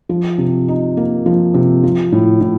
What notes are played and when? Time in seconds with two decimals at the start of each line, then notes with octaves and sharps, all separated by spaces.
0.09 F3
0.38 C3
0.68 D#4
0.97 A#3
1.26 F3
1.54 C3
1.83 F3
2.12 A2
2.41 A2